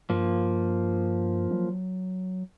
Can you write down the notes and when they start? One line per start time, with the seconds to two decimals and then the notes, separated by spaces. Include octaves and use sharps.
0.10 G2 F3 A#3
1.51 F#3